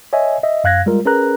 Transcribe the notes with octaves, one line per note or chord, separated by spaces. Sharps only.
C#5 D#5 E5 G#5
D#5 E5
F#2 F5 F#6 G#6 A#6
G3 G#3 F4 A#4
C#4 G#4 A#4 B4 A#5 F#6